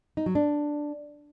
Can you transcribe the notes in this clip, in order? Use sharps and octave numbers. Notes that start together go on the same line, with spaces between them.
D#4
F#3
D4